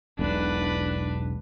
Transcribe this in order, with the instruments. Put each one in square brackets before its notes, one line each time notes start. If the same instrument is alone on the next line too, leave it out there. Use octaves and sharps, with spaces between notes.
[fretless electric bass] E1 B1 [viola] D4 B4